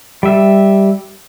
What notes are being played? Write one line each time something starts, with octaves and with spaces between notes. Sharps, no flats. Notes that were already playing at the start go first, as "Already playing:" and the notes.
G3 E5